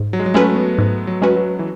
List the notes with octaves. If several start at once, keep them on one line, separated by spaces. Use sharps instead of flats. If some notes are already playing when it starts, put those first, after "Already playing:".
Already playing: G#2
F#3
G#3
F#3
G#3 A3 C#4 F#4 B4
B3
G#2
F#3
G#3 C#4 F#4 B4
F#3
E3